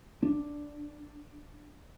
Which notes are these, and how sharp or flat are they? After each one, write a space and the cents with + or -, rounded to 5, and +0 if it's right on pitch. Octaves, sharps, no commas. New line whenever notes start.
D4 +0